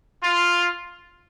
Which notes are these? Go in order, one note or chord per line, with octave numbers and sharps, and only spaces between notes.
F4